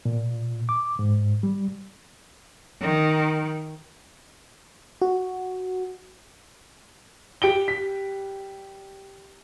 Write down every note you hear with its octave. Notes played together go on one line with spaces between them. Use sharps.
A#2
D6
G#2
G3
D#3
F#4
G3 G4 D7 G7
B6